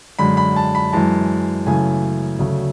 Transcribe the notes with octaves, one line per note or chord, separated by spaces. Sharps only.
F#2 D3 G#3 B5
B5
A5
B5
F#2 E3 G#3 A5
F#2 C#3 E3 A3 G#5
D2 C#3 F#3 A3